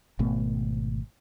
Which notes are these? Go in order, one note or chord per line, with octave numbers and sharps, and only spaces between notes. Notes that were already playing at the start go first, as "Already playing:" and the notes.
G#1 B2 A3 B3